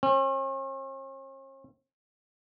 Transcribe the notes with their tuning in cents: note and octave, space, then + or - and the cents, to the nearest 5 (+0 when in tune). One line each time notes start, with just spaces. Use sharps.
C#4 -45